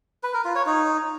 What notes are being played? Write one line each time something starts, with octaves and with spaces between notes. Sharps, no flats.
B4
A#4
F4
C#5
D#4